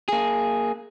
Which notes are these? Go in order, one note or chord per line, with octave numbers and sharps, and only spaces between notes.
A#3 G#4